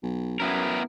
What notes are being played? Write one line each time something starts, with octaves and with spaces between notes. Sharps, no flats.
B1
F#2 B3 E4 A#4